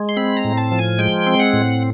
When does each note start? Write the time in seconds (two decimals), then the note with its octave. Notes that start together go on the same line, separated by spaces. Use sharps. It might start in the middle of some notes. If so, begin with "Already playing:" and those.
Already playing: G#3
0.09 C6
0.17 C4 B5
0.37 A#5
0.44 A2
0.57 A5
0.72 F3
0.79 G#5
0.98 G#3 G5
1.27 C4
1.40 F#5
1.53 A2